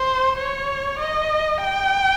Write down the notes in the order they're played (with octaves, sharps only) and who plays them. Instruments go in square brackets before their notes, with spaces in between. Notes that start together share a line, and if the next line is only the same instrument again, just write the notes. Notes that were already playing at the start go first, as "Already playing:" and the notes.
Already playing: [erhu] C5
C#5
D#5
G5